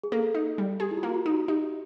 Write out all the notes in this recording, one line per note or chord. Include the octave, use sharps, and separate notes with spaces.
G#4
A#3 A4
D#4
G3
G4 G#4
E4
F4
A#3
F#4
F4
D#4
F#4
D#4 G4